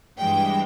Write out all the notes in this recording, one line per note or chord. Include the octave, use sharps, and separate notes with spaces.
G2 E3 G#3 G5